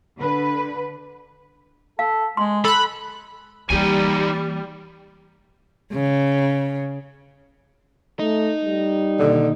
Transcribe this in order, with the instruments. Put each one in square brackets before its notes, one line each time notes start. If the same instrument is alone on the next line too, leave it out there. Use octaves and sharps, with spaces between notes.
[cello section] D3 B4
[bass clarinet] A4 [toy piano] F5
[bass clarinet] G#3 [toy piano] C6
[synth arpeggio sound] A4 F#6 [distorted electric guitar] B5
[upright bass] E3 A#3 [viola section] G3 [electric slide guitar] D#4 G4 G#5
[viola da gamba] C#3
[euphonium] A3 [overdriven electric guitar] D#4
[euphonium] G3
[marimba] B2 D#3 A#3 [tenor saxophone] D3